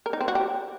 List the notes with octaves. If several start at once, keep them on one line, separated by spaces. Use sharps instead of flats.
A#4
D#4
C4
F#4
G4